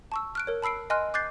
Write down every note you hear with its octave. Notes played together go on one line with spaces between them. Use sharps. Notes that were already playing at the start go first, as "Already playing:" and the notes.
A5 C#6 E6
F6 F#6 D7
A#4 C#5
A5 B5 E6 C7 D7
D#5 G#5 C6 F6 F#6
D6 F#6 G6 A6 C7